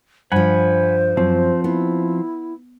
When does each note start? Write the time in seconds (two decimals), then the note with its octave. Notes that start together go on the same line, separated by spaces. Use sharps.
0.32 G2 F3 C5 F#5 G#5 B5
1.17 F#2 F3 C4
1.64 B3 E4